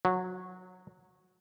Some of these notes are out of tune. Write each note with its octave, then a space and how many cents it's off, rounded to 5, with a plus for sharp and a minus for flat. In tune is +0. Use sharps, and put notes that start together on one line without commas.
F#3 -15